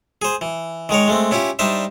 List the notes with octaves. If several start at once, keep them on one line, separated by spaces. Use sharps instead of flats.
G#4 C5
E3
D#3 G#3 A#4 C#5
G#3 A3 C4
C#4 E4 F4 G4
G3 D4 D#4 C5 E5